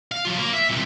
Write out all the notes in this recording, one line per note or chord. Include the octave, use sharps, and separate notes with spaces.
F5
F#3 F4
A#3
E5
C2 A#2